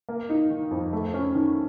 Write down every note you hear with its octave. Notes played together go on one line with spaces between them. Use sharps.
A#3
D#4
D#3
F2
A3
C#4
D#3